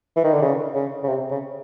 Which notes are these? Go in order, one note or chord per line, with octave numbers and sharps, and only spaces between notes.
E3
D#3
D3
C#3
C#3
C#3
C3
C#3